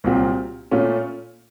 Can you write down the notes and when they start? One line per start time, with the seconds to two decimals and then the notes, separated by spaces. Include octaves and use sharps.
0.04 C2 A#2 F#3 C4 F4
0.71 A#2 A3 C#4 F4